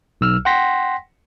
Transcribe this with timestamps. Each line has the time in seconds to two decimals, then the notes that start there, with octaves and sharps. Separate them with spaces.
0.21 B1 E6 F6
0.45 F#5 G5 C6 A#6 B6